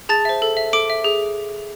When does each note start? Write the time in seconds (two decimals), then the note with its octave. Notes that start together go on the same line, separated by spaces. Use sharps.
0.09 G#4 A5 A6
0.25 C5 E5
0.42 A4
0.57 E5
0.73 A4 D6 D7
0.90 E5
1.05 G#4